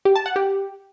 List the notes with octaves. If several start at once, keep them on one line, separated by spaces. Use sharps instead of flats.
G4
A5
F#5
G4